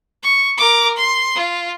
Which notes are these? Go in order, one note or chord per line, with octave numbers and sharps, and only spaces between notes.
C#6
A#4 D6
C6
F4